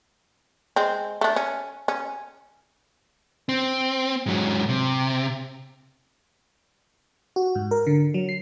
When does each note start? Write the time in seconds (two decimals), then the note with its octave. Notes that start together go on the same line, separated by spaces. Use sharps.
0.76 G#3 C4
1.21 A3 D4
1.36 C#4
1.88 C#4
3.49 C4
4.26 G#2 F#3
4.69 C3
7.36 F#4
7.55 G#2
7.71 A#4
7.87 D3
8.14 F#3
8.29 C7